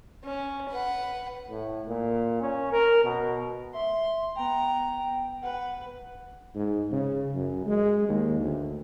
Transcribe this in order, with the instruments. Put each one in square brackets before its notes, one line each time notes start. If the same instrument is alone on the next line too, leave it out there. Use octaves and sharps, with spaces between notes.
[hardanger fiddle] C#4
B4 F#5
[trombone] A2
A#2
C#4
A#4
B2
[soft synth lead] E5 [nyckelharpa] C6
[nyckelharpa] B3 A#5 [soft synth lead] G5
[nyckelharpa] B4 [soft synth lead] F#5
[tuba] G#2
C#3
F#2
G#3
D#2
D2